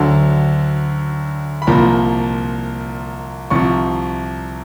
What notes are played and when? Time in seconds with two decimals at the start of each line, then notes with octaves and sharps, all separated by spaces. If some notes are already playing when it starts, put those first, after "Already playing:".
Already playing: D2 D3 F#3 A5
1.62 B5
1.67 C2 A#2 F3 A#3 A#5
3.50 C2 C3 F3 C#6